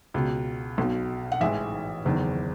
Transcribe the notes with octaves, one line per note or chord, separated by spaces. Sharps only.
C#2 B2
B1 B2
F#5
A1 G#2 E3 E5
F#1 E2 D#3